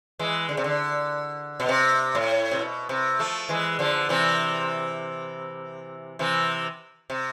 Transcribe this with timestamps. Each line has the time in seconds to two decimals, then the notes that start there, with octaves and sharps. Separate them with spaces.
0.19 E3 G#3
0.49 D3
0.57 C3
0.64 D3
1.60 B2
1.69 C3
2.15 A2
2.51 C3
2.59 B2
2.89 C3
3.19 F3 A3
3.49 E3 G#3
3.79 D3 F3
4.09 C3 E3
6.19 C3 E3
7.10 C3